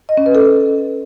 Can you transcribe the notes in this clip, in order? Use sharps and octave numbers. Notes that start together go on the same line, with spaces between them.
D#5
C#4
B4
A4